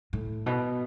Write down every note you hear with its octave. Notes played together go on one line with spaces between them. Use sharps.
A2
B2